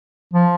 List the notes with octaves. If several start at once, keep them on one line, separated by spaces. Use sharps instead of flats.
F3